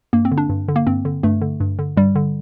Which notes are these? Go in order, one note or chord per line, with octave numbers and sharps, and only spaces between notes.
G2 A#3
C4
D3
D4
G2
D3
A#3
G2 C4
D3
G2 A3
D3
G2
D3
G2 G3
D3